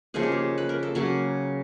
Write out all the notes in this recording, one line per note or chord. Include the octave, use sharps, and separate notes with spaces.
C#3 F3 A#3 D#4 G#4
G4
G#4
B4
A#4
A4
C#3 F#3 A#3 G#4